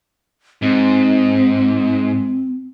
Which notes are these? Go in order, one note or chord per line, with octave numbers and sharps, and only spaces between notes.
G#2 C4